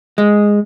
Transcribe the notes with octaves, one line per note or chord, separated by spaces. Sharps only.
G#3